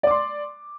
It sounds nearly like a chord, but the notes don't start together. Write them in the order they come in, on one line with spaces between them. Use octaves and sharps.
D5 D6 C6